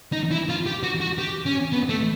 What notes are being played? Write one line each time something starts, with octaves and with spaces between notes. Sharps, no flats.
D#4
E4
F4
G4
F#4
F#4
G4
C#4
B3
A3